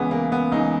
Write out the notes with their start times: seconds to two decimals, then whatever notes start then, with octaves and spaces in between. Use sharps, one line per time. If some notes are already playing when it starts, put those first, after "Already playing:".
Already playing: C#2 C#3 E3 B3
0.11 A#3
0.32 B3
0.52 C#2 C#3 E3 D#4